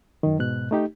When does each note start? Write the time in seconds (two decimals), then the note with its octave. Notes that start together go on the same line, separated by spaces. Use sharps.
0.23 F#2 D#3
0.39 G#2 B2 F#6
0.71 A3 D#4 G4